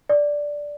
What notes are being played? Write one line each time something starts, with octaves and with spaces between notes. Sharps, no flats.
D5